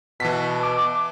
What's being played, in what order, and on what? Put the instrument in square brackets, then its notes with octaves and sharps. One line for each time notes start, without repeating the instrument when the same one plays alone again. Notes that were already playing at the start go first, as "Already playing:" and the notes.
[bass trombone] B2 [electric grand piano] E3 A5 B6
[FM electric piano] D6